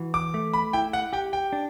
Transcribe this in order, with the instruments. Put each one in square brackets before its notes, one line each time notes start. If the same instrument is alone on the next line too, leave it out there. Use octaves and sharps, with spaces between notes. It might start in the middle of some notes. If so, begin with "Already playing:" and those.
Already playing: [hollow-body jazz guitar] E3 F#4
[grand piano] D6
[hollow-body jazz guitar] A3
[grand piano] B5
[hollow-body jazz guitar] E4 [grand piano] G5
[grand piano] F#5
[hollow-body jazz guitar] G4 [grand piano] G5
[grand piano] G5
[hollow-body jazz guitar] D4